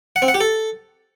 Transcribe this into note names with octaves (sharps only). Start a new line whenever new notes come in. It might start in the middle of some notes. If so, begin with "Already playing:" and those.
F#5
C4
F#5
G4
A4